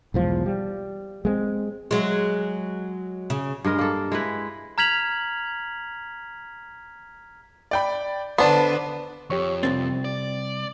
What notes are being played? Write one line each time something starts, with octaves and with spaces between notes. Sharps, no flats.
B1 E2 F3 G#3
G3
G#3 A3 C4
F#3 G#3
C#3
G2 G#3 A#4 D#5
A#3 A4
G#3 E4 B4
A#5 F6 G#6 B6 F7 F#7
D5 G5 B5
D3 B3 D4 B4 C5 A5 B5 C6
F2 G4 C#5 C#6
C2 F#2 C4 A6
D5